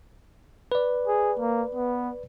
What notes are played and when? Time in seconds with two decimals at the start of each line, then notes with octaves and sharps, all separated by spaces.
0.72 B4 D5
1.07 G#4
1.39 A#3
1.75 B3